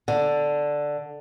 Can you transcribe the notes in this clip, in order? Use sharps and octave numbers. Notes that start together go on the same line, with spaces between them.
D3